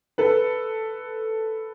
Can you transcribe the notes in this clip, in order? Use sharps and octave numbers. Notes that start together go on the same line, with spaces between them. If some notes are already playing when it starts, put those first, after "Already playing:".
A4 B4